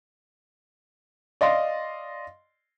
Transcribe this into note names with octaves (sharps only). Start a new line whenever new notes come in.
D5 D#5 F5 C6